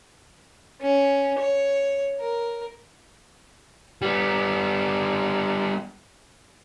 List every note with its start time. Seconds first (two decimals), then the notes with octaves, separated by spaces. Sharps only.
0.81 C#4
1.39 C#5
2.20 A#4
4.02 G3 B3